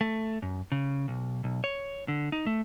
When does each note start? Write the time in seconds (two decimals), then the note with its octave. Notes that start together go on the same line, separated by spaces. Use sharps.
0.01 A3
0.42 F#2
0.72 C#3
1.08 B1
1.44 B1
1.64 C#5
2.08 D3
2.32 D#4
2.46 A3